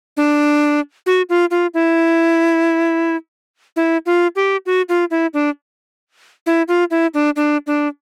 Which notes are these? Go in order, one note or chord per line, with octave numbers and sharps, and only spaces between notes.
D4
F#4
F4
F4
E4
E4
F4
G4
F#4
F4
E4
D4
E4
F4
E4
D4
D4
D4